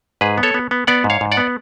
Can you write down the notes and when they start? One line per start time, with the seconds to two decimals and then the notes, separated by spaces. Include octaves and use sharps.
0.21 G#2 G#4 B4
0.38 B3
0.43 A4 C#5
0.54 B3
0.71 B3
0.87 B3 D5 F#5
1.04 G#2
1.10 C#5 F5
1.21 G#2
1.32 D5 F#5
1.37 B3